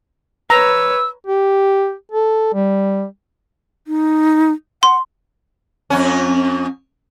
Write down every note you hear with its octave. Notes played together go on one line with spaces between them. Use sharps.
B4 C#5 A#5 E6
G4
A4
G3
D#4
F#5 C6
F2 C#4